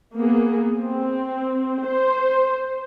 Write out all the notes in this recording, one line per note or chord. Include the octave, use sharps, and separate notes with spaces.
A#3 B3 G#4
C4
C5